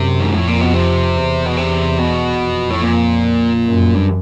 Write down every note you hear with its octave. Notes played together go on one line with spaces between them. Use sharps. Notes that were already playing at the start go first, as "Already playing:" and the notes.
Already playing: F#2 C3
G#2
F2 A2
A#2
B2
C3
E2
B2
C3
B2
F2
A2
A#2
F#2
G2